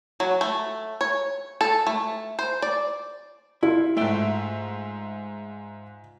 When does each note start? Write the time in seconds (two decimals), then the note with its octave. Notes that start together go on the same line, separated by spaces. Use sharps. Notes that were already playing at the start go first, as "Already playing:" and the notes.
0.20 F#3
0.41 A3
1.01 C#5
1.61 A4
1.87 A3
2.39 C5
2.62 D5
3.63 E4 F4
3.97 G#2 A3 E5 G5